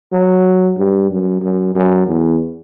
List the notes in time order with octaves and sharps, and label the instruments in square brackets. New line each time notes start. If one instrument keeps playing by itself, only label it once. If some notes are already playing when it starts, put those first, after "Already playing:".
[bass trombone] F#3
G2
F#2
F#2
F#2
E2